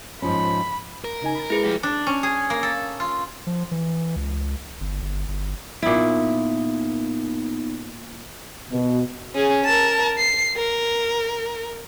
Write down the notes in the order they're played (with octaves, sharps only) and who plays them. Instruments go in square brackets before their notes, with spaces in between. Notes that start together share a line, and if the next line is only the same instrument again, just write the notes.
[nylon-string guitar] G#2 F3 C#4 [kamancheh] B5
[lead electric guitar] A#4
[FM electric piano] C#3 D#4 G#5
B5 A6
[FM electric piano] G#3 [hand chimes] E4 G#4 B4
[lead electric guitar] F3 G4
[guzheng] D4
C#4
G#4
A#3
A4
F4
[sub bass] F3
E3
C#2
G1
G1
G1
[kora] A#2 E4 [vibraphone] B3 D#4
[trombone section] B2
[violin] C#4 G#4
A#4 A5
C7
A#4